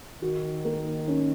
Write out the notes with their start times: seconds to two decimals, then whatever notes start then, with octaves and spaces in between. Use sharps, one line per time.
0.22 D#3 F#4
0.65 A#3
1.08 C#4